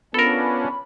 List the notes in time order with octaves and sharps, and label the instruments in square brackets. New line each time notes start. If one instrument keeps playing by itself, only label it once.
[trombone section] B3 F4 [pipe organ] C#4 D4 [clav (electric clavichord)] A4 A#4 [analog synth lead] B5